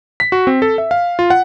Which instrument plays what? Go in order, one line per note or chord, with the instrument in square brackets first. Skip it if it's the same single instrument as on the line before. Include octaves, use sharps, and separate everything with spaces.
[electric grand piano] B6
F#4
C4
A4
E5
F5
F4
F#5